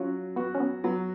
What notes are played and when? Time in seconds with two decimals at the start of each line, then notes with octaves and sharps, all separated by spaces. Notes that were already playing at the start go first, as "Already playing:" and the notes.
Already playing: F#3 C#4 F4 F#4
0.36 B3 F#4
0.55 C#4
0.60 B3
0.84 F#3 B3